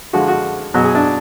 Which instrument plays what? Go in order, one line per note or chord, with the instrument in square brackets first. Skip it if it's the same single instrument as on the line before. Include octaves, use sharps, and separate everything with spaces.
[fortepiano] D3 F3 G#3 F#4
F#4
B2 F#3 G#4
G#4
D4